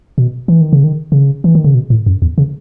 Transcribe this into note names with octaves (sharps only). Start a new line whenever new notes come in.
B2
E3
D#3
C#3
D#3
C#3
E3
D#3
C#3
B2
A2
F#2
E2
C#3